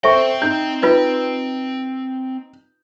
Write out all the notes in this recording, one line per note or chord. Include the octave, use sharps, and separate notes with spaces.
C4 A4 C5 E5 G5 C#6
D#4 G6
D#4 F4 B4 D#5